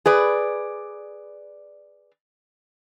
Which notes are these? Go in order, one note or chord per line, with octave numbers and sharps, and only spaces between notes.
G#4 B4 D5